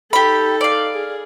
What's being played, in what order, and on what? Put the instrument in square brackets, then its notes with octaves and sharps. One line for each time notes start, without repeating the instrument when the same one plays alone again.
[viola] D#4 A4 [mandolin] G4 B5
[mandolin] D5 F5
[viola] G#4